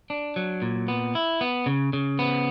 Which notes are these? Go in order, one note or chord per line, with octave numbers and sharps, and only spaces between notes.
D4
F#3
A#2
B3
E4
B3
C#3
C#3
B3